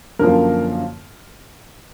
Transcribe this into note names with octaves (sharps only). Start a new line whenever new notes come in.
F#2 D3 F3 A#3 A#4